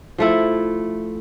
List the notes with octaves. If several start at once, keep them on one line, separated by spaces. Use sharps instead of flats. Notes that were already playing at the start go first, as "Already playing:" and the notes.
F3 A3 E4